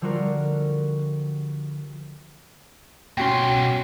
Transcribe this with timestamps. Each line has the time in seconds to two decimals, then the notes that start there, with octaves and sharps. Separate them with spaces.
0.01 D3 F3 G3 F4 F#4 A#4
3.17 B2 C#4 F#4 G5 C6